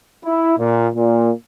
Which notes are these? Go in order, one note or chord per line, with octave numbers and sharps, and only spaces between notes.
E4
A#2
A#2